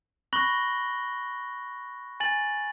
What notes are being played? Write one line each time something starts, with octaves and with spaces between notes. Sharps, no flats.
B5 C#6 F#6 A#6 F#7 G7
G#5 A6 F#7